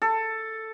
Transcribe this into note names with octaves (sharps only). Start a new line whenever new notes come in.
A4